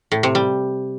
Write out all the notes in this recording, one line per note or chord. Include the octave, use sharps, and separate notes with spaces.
A2
C3
G3